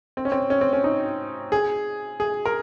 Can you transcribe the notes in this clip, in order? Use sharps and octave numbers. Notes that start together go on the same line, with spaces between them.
C4
C#4
C4
C#4
C4
C#4
D#4
G#4
G#4
A#4